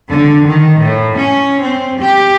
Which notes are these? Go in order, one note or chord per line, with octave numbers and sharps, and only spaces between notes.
D3
D#3
A2
C#4
C4
G4